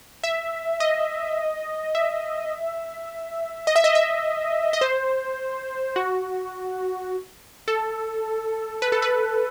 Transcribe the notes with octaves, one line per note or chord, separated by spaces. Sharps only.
E5
D#5
E5
D#5
E5
D#5
E5
D#5
C5
F#4
A4
B4
A4
B4